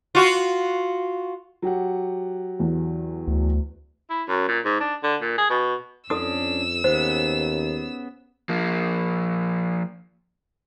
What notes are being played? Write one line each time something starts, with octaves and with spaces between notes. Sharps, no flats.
F4 F#4
F#3 G4 F#5
E2
D2
E4
F#2
A#2
G#2
D4
D3
A#2
G#4
B2
F2 C#4 D4 A4 D#6 E6
D#2 B3 C#4 G#4 C5
F3 A#3